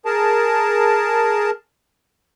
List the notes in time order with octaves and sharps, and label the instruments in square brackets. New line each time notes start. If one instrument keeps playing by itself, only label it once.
[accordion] G#4 A#4 A5